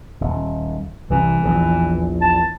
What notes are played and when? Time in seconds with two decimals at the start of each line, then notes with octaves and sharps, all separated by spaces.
0.21 D#1
1.10 C2 E3
1.43 A#1 E2
2.21 A5